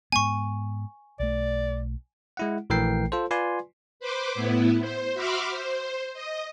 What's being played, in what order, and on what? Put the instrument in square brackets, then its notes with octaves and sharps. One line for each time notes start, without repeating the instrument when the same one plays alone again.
[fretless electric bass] G#2 G#3 B3 [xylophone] G#5 C#6
[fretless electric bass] B1 A3 [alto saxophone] D5
[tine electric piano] G#3 E4 F#5
A#1 E3 A3 A#4 G5 C7
F4 A4 C5
F4 B4 D5 G#5 C6
[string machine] B4 C5 D6
A2 B3 E4
C5
F#4 E5 B5 C6 D6 F6
C5
D#5